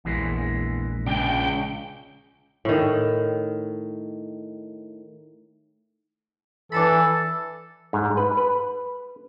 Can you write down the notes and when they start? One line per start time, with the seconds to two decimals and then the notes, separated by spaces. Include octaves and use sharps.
0.05 A#1 E2 E3 G#3
1.06 C#2 D4 G5
2.65 A2 D#3
6.72 E3 D4 A4 A5 B5
7.93 G#2
8.17 B4
8.37 B4